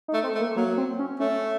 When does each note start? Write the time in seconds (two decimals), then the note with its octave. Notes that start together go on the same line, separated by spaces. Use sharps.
0.08 D#4
0.14 A3
0.24 C4
0.35 A3
0.40 A#3
0.56 F#3 A#3
0.78 C4
0.99 C#4
1.20 A3 C#4